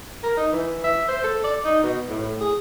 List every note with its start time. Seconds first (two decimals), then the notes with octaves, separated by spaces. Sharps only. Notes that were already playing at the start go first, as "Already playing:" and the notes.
0.23 A#4
0.37 D#4
0.52 E3
0.84 E5
1.09 C5
1.24 A4
1.44 D5
1.65 D#4
1.83 B2
2.09 A2
2.41 G#4